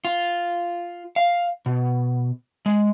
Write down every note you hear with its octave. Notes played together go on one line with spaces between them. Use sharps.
F4
F5
B2
G#3